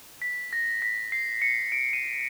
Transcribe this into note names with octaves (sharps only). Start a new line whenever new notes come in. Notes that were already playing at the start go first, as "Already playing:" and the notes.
B6
A#6
B6
C7
C#7
D7
D#7